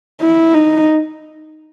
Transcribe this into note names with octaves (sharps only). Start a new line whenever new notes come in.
E4
D#4